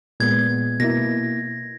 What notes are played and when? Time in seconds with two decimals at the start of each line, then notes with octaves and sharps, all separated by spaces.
0.20 A#2 G#3 B3 G#6
0.80 B2 A#3 E4 A#6